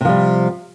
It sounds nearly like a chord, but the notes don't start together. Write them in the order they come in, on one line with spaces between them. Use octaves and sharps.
C3 F3 G3